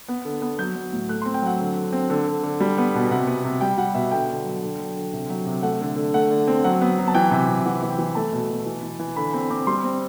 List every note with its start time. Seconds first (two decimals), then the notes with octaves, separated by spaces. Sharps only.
0.08 B3
0.25 D3
0.42 B3
0.59 F#3 G6
0.76 F#3
0.93 A2
1.09 A3 F#6
1.22 C4 C6
1.34 G5
1.42 F#3 F#5
1.60 D3
1.77 D3
1.93 C4
2.10 D3
2.27 D3
2.43 D3
2.60 G3
2.78 B3
2.95 B2
3.11 C3 F#5
3.27 B3
3.44 C3
3.61 G3 G5
3.78 G3 F#5
3.94 B2 E5
4.12 D3 G5
4.29 D3
4.45 F#3
4.63 D3
4.79 F#3
4.97 D3
5.13 C3
5.30 F#3
5.46 C3
5.63 A3 F#5
5.81 D3
5.96 D3
6.14 A3 F#5
6.30 D3
6.47 C4
6.64 F#3 F#5
6.81 B3
6.98 F#3
7.08 A5
7.15 E3 G5
7.31 C3
7.49 C3
7.65 E3 F#5
7.83 E3
7.90 G5
7.99 E3
8.15 A3 A5
8.33 B2
8.49 B2
8.66 E3
8.83 E3
9.00 E3
9.16 D3 B5
9.33 C4 B5
9.50 C4 D6
9.67 G3 C6
9.84 C4